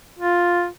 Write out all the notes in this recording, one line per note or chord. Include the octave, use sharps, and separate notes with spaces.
F4